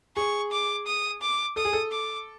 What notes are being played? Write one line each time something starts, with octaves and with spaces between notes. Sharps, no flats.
G#4 C#6
D6
D#6
D6
A4 D#6
G#4
A4
D6